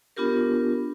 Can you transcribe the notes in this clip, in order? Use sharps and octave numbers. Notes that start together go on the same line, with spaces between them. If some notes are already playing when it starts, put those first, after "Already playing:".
B3 D4 F4 G4 A#4